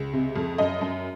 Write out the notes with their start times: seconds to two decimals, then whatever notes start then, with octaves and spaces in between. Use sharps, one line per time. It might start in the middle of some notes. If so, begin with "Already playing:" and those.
Already playing: C#2
0.13 C3
0.36 F2
0.58 F#2 D#5
0.81 F#2